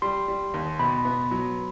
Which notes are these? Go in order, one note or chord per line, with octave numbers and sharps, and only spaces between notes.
G3 C6
G3
D#2
B2 B5
B3
F#3